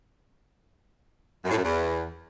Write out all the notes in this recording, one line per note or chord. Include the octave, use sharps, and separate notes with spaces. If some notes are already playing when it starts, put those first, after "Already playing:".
F#2
A2
F#2
E2